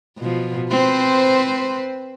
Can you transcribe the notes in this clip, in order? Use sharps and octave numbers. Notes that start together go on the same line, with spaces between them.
B2 F3
C4 B4 C5